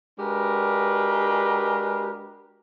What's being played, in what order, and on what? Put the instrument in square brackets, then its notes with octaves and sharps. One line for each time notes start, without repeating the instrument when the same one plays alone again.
[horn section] G#3 D4 F#4 G4 A#4 B4